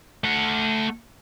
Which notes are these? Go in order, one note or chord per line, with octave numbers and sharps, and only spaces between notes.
A3 F#5